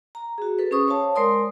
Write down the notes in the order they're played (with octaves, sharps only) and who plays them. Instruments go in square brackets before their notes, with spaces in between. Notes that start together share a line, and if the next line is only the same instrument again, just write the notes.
[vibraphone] A#5
F#4 G#4
A4 B4
C#4 G#4 C5 C#6 D#6
C5 C#5 F5 A5
G#3 A#4 C5 D5 C6 D#6